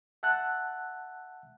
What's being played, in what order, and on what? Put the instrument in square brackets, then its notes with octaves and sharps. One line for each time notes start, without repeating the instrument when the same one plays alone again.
[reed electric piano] E5 F#5 A5 E6 F#6